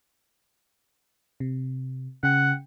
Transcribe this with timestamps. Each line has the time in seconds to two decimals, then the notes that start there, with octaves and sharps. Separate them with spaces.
1.40 C3
2.23 C#3 F#5 G5 C#7